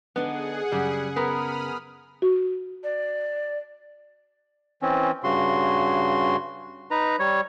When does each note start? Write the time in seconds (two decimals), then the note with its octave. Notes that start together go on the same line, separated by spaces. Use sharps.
0.16 D3 B3 D4 D#4 G#4 F#5
0.72 F#2 C#3 G3
1.16 B3 A#4 B5 D#6 F6
2.22 F#4
2.84 D5
4.82 E3 C4 C#4
5.24 G2 C#3 F#4 C6
6.91 D#4 B4 A#5
7.20 G3 C#5